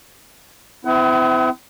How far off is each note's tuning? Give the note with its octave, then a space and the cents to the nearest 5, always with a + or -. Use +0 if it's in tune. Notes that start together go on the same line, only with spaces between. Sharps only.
C4 -40 E4 +0 F#5 +35